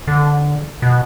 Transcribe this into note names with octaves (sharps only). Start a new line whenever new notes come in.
D3
B2